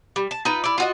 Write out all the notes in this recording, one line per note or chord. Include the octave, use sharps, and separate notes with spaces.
G3
A5
D#4 F4 B4
E4 D5
F4 F#4 D#5